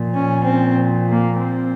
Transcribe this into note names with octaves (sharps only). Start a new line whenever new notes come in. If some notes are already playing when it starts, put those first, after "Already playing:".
Already playing: A#2 F3
C#4
C4
A#3
C4